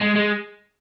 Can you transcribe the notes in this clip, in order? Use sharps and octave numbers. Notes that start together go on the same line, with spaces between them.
G#3
G#3